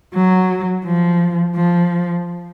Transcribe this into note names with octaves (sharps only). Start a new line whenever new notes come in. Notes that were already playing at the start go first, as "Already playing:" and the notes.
F#3
F3
F3